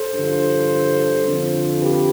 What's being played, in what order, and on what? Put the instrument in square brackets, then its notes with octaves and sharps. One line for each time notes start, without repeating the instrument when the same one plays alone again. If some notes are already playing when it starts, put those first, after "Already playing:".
Already playing: [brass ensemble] A4 C5
G2 D3 F3
F2 D3 F3
G4 B4